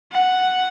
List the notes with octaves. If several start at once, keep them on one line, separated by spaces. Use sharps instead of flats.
F#5